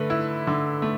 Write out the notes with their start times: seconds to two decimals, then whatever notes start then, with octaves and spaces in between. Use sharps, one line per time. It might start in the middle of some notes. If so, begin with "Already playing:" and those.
Already playing: D3 A3 B4
0.10 E4
0.47 D3
0.82 A3